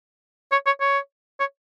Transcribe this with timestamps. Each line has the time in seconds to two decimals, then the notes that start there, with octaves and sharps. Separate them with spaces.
0.52 C#5
0.66 C#5
0.81 C#5
1.40 C#5